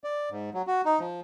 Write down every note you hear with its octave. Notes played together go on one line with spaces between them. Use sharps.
D5
G#2
F#3
F#4
D#4
F3